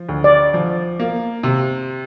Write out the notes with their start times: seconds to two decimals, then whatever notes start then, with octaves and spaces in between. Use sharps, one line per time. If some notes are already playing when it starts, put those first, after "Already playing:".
Already playing: F3
0.09 D2
0.24 D5
0.54 F3
1.00 A#3
1.43 C3